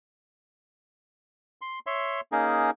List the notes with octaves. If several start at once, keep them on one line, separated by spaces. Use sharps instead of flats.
C6
C#5 E5 C6
A#3 C#4 D#4 G#4 A#4